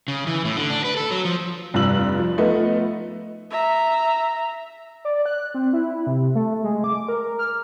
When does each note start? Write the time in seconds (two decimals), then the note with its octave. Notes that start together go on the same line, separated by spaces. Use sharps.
0.08 C#3
0.27 E3
0.45 A2
0.57 D3
0.70 D4
0.85 B4
0.97 A4
1.11 F#3
1.25 F3
1.74 F1 G2 F4 E6 F#7
2.19 F3
2.38 F3 A3 B3 D#4
3.50 E5 A#5
5.05 D5
5.26 F#6
5.54 C4
5.73 E4
6.07 C3
6.35 A3
6.64 G#3
6.84 D6
7.09 A#4
7.39 F6